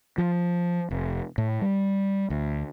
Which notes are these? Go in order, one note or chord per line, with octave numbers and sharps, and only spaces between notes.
F3
F1
A2
G3
D2